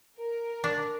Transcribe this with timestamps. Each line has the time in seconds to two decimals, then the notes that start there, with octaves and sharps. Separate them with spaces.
0.18 A#4
0.64 D4